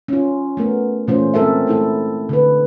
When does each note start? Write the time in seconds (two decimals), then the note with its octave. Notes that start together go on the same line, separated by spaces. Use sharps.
0.08 C#4 F4
0.57 A3 B3 A#4
1.08 A#2 E3 A3 C#4 F4 C5
1.34 G#3 C4 A4 A#4 E5
1.67 A3 E4 A4
2.29 D3 B4